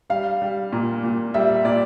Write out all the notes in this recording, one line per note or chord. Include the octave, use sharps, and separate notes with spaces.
G3 F5
G3
A#2
A#2
G3 E5
A#2 D5